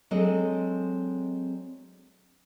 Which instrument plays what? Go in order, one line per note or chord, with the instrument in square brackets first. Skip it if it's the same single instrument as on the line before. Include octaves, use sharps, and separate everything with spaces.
[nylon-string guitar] F#3 G#3 C4 D4 A4 D#5